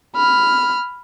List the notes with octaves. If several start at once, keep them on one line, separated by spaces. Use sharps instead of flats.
B5 F6